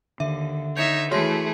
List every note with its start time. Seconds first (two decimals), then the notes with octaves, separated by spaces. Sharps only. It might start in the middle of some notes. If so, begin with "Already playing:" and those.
0.20 D#2 D3 E5
0.77 D#4 C#5 E5 G6 C#7
1.11 E3 A3 F#4 G#4 C#5 C6